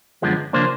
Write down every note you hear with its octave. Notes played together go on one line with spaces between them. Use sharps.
F#2 D3 F3 G#3 B3
C#3 F3 A#3 D4 C5